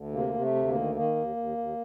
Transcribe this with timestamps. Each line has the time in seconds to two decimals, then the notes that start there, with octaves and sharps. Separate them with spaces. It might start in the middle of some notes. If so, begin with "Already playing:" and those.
Already playing: D2
0.13 C3 A#3
0.34 C3
0.41 A3
0.55 D2
0.68 A#3
0.74 D#3
0.95 D#3 A#3
1.16 D#2
1.36 D#2
1.57 D#2